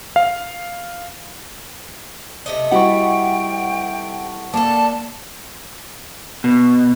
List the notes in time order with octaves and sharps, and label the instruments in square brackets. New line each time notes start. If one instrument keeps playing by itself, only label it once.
[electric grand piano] F5
[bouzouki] C3 A3 D#5
[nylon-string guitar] G3 E4 F#4 [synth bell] F#5 C#6 [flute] G5
[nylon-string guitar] A#3 [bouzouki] D4 A4 [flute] A5
[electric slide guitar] B2